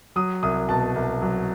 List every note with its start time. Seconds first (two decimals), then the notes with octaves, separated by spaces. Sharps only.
0.16 F#3 D#6
0.43 C2 D#6
0.69 B2 A5
0.95 C2
1.22 F#3